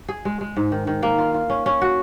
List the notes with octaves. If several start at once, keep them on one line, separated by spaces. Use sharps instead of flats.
G#4
G#3
G#3
G#2
D#3
D#3
A#3
F4
F4
C#4
C#4
F#4